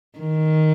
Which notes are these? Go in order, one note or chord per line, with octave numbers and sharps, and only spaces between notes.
D#3